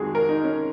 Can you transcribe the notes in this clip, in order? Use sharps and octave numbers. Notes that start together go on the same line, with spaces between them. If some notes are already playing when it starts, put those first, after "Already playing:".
Already playing: F2 D#3 G#3 F#4 G#4
A#4
D#4
C#4